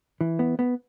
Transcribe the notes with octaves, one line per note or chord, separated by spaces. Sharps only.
E3
B3
B3